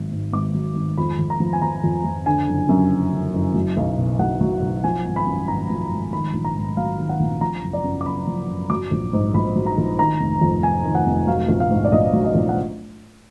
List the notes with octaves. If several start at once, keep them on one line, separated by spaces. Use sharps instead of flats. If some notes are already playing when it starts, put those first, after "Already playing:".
Already playing: G#1 F#3
G#2
G#1 D6
F#3
G#1
F2 B5
F2
A#5
F3
G#5
F3 A#5
F2
F2
D3 G#5
F#1
F#2
F#1
D3
F#1
F#3
B1
B2
B1 F#5
F#3
B1
F3 G#5
G#1
B5
F#2
G#1 A#5
F3
G#1
D#3 B5
A#1
A#5
G#2
F#3 F5
D#3
F#5
A#1
F3 A#5
F#1
D5
F#2
D6
F#1 B5
F3
F#1
F#3 D6
A#1
G#2
A#1 B5
F#3
A#5
A#1
D#3 A#5
F1
F2
F1 G#5
D#3
F#5
F1
F#3 F5
A#1
F5
G#2
D5
A#1 D#5
F#3
D#5
A#1
F#5